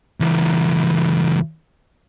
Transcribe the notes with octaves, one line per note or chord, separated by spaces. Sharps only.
C#2 E3